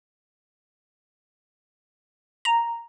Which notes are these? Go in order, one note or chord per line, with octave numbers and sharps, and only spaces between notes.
A#5